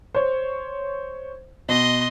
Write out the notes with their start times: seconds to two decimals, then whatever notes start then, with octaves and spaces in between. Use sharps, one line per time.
0.15 C5 C#5
1.69 B2 D#5 C6